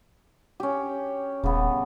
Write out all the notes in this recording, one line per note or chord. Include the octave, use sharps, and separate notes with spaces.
C#4 G4
D#1 C#3 B3